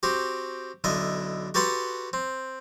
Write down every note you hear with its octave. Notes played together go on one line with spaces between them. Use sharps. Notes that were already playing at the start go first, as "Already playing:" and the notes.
C4 F#4 G4
B1 D3 E4 D#5
F#4 G4 A4 B4 F#5 C6
C4